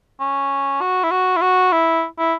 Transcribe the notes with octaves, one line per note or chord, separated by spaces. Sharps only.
C#4
F#4
E4
F#4
E4
F#4
E4
E4